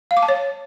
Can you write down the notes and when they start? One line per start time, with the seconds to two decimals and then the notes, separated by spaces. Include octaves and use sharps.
0.11 F5
0.17 D6
0.23 A5
0.28 C#5